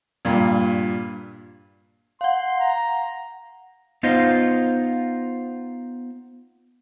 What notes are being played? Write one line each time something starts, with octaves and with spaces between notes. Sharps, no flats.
G2 A#2
F5 F#5 C6
A#5
B3 D#4 F4 C5 D#5